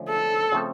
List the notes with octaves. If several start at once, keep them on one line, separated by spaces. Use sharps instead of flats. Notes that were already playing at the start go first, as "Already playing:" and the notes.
Already playing: D3 F3 A3 C#4
A4
C#3 F3 A3 C4